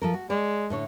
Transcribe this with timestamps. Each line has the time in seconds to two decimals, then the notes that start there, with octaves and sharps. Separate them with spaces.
0.02 F3 A4 A#4
0.14 F#4
0.30 G#3 D5
0.70 A2 D3 C#5